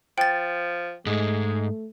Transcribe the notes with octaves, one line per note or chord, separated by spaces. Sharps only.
F3 G5 A6
G#2 G#3 A3